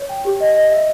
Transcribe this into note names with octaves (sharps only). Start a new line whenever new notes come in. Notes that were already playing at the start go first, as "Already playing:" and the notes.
Already playing: C#5
G5
G4
D#5
D#5
E5